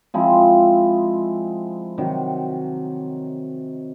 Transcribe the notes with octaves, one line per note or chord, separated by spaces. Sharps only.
F3 G#3 C4 E4
C3 D#3 F#3